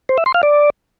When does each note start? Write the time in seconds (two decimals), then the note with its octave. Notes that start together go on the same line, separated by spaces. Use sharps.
0.09 C5
0.18 E5
0.26 C6
0.34 F5
0.43 D5